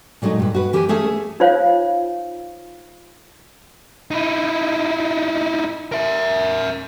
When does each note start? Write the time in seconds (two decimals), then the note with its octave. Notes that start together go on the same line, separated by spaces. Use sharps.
0.22 A#2 F#3 G#3 A3 D#4
0.39 G2 B4
0.54 F#4 B4
0.73 E3 G4 A#4 C5 G#5
0.89 A3 C#4 G#4 A4 E5 A5
1.40 D#4 F4 C5 C#5 F5
4.11 D#4 E4
5.92 A#4 E5